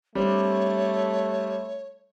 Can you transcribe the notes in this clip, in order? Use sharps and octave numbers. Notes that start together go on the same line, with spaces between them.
G3 A3 C4 D4 C#5